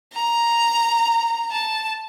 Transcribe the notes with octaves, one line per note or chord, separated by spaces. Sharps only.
A#5
A5